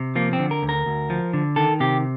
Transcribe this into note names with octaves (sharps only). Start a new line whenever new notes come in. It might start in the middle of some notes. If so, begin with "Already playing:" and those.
Already playing: C3
F3 A#3
C4
D3
A#4
D2
A#4
D2
F3
D3
D#3 A4
C3 G4